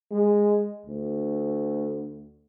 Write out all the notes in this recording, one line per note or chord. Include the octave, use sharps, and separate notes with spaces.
G#3
D2